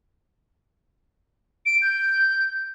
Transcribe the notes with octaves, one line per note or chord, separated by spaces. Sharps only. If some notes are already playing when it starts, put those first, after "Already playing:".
D7
G6